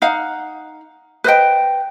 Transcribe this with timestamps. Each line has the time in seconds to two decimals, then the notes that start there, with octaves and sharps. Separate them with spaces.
0.02 D#4 F5 F#5
1.24 B4 C5 D#5 G5